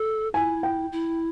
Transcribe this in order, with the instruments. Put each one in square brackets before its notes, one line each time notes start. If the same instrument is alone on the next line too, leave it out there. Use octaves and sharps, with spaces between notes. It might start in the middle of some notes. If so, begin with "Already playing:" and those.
Already playing: [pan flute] A4
[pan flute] E4 [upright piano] G#5
[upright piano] G5
[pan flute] E4